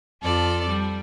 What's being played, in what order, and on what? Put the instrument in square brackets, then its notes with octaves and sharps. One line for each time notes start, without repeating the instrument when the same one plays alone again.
[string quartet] F2 F4 A4 D5
G3